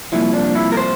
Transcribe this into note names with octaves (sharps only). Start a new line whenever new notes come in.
C2 A#2 F3 E4
D4
E4
A#4
C5